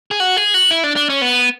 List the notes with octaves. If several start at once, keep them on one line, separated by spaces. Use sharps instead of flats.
G#4
F#4
G#4
F#4
E4
D4
D4
C#4
B3